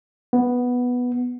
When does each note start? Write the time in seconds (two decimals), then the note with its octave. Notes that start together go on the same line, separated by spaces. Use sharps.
0.33 B3